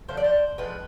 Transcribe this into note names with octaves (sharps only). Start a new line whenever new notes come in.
D3 F3 A3 C5
D5
C5
A2 F3 G#3 B4